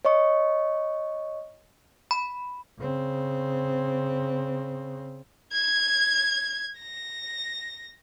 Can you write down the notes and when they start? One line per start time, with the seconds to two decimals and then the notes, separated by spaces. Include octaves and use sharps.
0.05 C#5 D#5 C#6
2.11 B5
2.79 C#3 C4
5.53 G#6
6.79 A#6